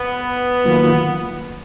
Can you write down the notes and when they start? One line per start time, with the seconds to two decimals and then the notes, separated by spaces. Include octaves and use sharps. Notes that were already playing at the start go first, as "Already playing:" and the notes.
Already playing: B3
0.65 D#3 F#3 A#3 F4